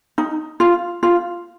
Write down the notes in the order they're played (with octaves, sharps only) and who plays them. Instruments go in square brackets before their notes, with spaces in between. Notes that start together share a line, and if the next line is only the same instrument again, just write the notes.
[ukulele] D#4
F4
F4